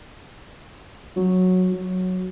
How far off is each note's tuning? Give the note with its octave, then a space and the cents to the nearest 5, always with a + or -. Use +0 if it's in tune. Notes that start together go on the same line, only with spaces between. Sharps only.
F#3 -10
F#3 -5